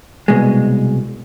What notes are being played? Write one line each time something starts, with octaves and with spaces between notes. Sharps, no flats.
C2 B2 G#3